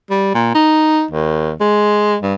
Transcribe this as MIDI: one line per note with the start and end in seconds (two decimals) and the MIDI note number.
0.10 0.34 55
0.35 0.52 46
0.55 1.05 63
1.11 1.52 39
1.61 2.17 56
2.22 2.34 43